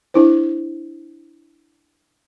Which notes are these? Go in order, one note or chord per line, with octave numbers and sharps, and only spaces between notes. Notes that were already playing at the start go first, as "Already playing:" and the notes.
D4 E4 C5